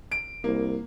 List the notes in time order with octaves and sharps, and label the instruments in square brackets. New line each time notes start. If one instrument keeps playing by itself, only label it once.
[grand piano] D7
[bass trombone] C2 [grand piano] A#3